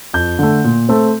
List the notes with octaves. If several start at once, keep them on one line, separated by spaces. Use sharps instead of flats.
F2 G6
D3 A3
A#2
A3 C4